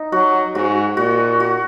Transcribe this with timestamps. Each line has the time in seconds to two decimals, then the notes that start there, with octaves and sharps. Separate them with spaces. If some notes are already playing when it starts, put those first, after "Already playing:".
Already playing: D#4
0.12 F#3 F#4
0.55 G#2 F#4
0.97 A#2 F#4
1.40 F#4